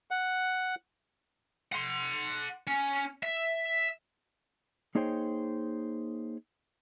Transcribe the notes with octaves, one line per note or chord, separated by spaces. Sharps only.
F#5
F#5 C6
C#4
E5
A#3 D#4 G#4 C5 C#5 G5